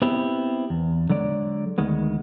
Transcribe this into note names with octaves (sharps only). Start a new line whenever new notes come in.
B3 C4 E4 G4
E2
D3 F#3 G#3 D5
D2 D#3 G#3 B3